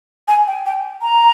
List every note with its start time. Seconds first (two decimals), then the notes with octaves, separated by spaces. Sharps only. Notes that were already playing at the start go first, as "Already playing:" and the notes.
0.28 G#5
0.47 G5
0.66 G5
1.02 A#5